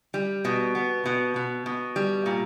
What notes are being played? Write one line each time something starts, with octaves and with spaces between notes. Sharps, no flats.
G3
B2
B3
B2
B2
B2
G3
A#2